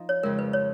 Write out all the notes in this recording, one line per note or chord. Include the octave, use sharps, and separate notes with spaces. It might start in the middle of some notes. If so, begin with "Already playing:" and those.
Already playing: F3 D#4
C#5
F2 C#3 G#3 A#4
B4
C#5